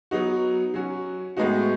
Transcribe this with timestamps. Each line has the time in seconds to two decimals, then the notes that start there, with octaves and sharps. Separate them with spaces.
0.11 F#3 B3 D#4 F#4
0.74 F#3 C#4 F#4
1.37 A2 G#3 B3 D#4 F#4